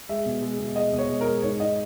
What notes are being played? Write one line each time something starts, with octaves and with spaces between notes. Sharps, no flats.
G#3 E5
B2
G#3
B2
G#3 D#5
B2
C#5
G#3
A#4
G#3
G#2 C#5
G#2 D#5